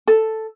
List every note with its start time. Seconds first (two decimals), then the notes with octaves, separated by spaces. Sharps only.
0.07 A4